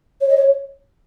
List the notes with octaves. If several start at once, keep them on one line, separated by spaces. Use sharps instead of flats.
C#5
D#5
C#5